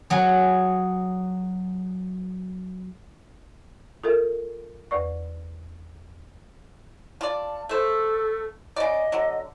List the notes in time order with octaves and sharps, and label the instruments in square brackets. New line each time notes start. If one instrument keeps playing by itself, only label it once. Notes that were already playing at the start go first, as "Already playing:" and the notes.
[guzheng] F#3 G#4
[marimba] F4 A4 A#4 E5
E2 B4 D5 C#6
[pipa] F4 D5 [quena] A5
[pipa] A3 C5 [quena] A4
[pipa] C#3 D5 [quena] D#5
[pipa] D3 F#3